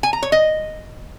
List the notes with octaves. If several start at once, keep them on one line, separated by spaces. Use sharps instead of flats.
G#5
A#5
C#5
D#5